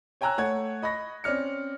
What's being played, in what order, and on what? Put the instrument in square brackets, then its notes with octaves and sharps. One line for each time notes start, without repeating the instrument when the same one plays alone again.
[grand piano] C#5 G5 G#5 A#5 E6 F#6
A3 C#5 F#5 G#6
D#5 B5 C#6 A#6
C4 C#4 D5 F6 C#7